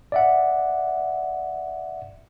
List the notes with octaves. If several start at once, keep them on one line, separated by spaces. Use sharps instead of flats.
D5 E5 F#5